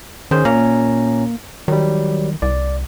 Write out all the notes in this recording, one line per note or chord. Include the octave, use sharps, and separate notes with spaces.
D#3 C#4 G#4 C5
A#2 A#3 C#4 A#5
D#3 F#3 G3
C2 D5